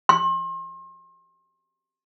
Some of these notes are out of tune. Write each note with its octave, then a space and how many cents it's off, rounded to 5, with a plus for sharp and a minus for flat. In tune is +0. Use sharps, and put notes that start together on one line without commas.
C6 +40